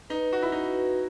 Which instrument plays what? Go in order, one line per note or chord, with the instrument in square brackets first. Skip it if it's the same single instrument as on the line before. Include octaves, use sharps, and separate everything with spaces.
[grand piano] D#4 [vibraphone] B4
[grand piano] F#4
E4
[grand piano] D#4 [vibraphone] F#4